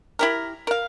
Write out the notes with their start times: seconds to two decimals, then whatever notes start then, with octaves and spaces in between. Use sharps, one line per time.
0.19 E4 G4 A#4
0.67 A#4 F5